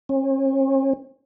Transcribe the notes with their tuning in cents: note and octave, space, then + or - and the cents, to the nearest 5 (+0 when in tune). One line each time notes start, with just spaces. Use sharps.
C#4 -45